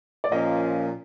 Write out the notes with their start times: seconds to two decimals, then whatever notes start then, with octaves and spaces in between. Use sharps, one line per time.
0.24 D5
0.31 A#2 F3 A#3 C#4 D#5